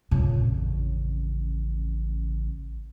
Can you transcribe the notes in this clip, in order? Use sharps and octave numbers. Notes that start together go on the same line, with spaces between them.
F2 A#2 C#3
A1